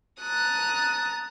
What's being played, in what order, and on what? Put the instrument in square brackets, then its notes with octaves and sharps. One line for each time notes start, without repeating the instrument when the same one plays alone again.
[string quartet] A5 A#5 D#6 F#6